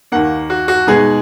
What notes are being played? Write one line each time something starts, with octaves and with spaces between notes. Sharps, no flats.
D#2 D#3 A#3 F#5
F#4
F#4
B2 G#3 D#4 G#4